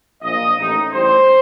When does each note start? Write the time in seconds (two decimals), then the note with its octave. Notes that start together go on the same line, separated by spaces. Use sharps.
0.22 A#1 A#2 F3 D#5
0.58 A1 A2 A3 D#4
0.92 A1 A2 G3 C5